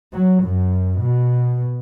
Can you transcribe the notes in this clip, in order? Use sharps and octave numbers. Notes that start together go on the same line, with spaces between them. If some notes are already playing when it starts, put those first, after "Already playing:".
F#3
F#2
B2